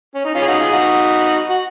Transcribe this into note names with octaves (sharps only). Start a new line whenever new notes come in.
C#4
D#4
C#4 F4
G#4
D#4 F#4
F4 G#4
D#4 F#4
F#4